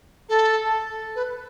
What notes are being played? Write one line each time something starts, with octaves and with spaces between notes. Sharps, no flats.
A4
B4